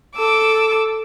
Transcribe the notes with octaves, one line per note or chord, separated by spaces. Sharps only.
A4 D6 E6